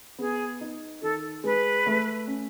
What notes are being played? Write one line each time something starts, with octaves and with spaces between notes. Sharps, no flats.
B3 G#4
D#4
D#3 A4
G#3 B4
A3
C#4